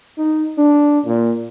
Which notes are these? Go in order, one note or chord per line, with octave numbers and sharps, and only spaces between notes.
D#4
D4
A#2